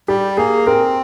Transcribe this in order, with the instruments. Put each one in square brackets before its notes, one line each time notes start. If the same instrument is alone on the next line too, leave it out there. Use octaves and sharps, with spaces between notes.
[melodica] G3 [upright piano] G4
[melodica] A#3 [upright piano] G#4
[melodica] C4 [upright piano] A#4